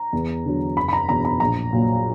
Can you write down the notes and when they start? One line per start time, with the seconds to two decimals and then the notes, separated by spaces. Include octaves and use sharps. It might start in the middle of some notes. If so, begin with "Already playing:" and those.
Already playing: A#5
0.13 E2
0.45 D3 F#3
0.77 F#1 B5
0.88 B5
0.93 A#5
1.08 E2 B2 F#3 A#5
1.25 A#5
1.40 A#1 A#5
1.73 A#2 F#3